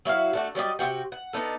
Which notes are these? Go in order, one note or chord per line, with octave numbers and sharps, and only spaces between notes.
F#3 E4 F#4 F5
A3 D4 F#4
F#3 G3 D5 D#5
C3 D4 F#4 G5
F#5
B3 D4 D#4 A4